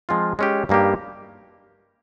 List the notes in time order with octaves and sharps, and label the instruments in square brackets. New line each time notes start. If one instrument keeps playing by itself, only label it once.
[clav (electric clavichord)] F3 G#3 C4 F4
G#3 C#4 G4
G2 G3 A#3 D#4 G4